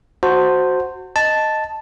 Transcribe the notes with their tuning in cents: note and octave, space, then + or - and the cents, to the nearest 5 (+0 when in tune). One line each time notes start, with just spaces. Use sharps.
F#4 +0 C5 +0 A5 +40
D#5 +0 A5 +0